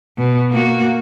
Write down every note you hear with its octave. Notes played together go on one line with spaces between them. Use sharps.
B2
A#3 F#4